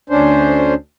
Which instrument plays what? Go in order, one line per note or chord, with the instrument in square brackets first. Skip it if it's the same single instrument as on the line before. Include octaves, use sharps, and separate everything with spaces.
[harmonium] D2 C#4 D4 C5